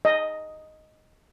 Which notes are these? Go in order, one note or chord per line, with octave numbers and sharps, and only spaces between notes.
D#5